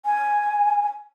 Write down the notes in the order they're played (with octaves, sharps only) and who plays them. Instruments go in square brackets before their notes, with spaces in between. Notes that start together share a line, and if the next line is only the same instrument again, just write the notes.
[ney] G#5